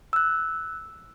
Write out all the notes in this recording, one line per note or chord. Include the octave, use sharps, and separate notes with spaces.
E6 F#6